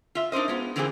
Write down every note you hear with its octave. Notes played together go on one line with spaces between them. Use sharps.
F4 E5
D4 D#4 A#4 C5 D#5
G#3 B3 F4
D3 E3 A#3 C4 F4 G#4